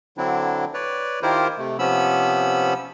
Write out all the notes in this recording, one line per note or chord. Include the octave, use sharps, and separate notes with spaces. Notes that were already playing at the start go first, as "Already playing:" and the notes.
D3 F#3 C4 D4 E4
B4 C#5 D5
D#3 E4 F4 G4 A#4 C5
C3 A3
C3 F3 B3 C#4 B5 E6